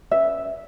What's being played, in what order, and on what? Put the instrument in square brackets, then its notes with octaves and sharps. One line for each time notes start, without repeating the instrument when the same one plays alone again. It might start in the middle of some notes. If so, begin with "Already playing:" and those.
[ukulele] C#4 G#4 B4 E5